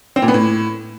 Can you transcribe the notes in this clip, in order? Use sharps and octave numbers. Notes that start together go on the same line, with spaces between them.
C4
A#2
B3
A2